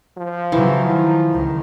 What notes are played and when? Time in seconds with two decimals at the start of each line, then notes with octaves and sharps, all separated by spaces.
0.17 F3
0.52 C#3 E3 F#3
0.85 D#3 F3
1.32 C#2 D#3